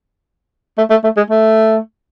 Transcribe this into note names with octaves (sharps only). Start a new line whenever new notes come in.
A3
A3
A3
G#3
A3